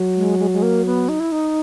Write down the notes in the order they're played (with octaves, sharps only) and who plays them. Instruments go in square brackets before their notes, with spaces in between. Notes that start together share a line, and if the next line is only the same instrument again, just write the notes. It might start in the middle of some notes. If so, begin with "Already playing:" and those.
Already playing: [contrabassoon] F#3
[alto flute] G#3
G#3
G#3
A#3
B3
D#4
E4
D#4